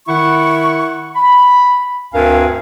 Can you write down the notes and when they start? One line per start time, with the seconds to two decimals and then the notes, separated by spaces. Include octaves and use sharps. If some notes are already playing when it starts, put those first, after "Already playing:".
0.07 D#3 E4 F#5 C#6
1.15 B5
2.14 D2 G2 C4 A#4 F5 G#5